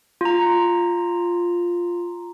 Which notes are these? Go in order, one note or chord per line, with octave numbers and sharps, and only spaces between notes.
F4 A#5